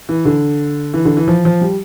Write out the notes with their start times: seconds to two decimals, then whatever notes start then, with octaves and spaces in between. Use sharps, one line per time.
0.09 E3
0.25 D3
0.94 E3
1.05 D3
1.17 E3
1.28 F3
1.45 F3
1.61 G3